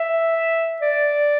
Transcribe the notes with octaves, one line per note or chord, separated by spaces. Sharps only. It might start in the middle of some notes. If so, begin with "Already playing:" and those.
Already playing: E5
D5